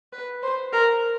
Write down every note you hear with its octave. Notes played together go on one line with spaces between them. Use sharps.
B4
C5
A#4